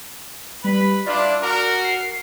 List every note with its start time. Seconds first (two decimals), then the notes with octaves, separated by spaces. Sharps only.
0.64 G3 B4 B5
1.06 D4 E4 F4 D5
1.42 F#4 A#4
1.84 C7